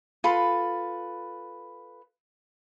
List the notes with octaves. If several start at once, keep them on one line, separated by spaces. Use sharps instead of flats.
F4 A4 B4 B5